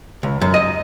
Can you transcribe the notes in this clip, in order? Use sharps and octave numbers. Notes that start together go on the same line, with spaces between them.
C#2
F#2
D#5